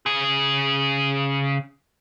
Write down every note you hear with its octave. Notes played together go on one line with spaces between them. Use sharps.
C#3 G#4